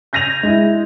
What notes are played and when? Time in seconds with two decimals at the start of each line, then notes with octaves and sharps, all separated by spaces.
0.13 G6 G#6 A#6 D#7 F7
0.43 G#3 E4